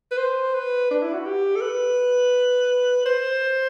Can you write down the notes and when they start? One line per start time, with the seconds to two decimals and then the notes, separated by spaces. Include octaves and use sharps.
0.11 B4
0.18 C5
0.54 B4
0.91 D4
1.02 E4
1.13 F#4
1.26 G4
1.56 A4
1.62 B4
3.06 C5